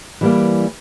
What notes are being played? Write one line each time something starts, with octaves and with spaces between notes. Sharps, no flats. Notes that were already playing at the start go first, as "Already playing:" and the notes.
E3 G3 A#3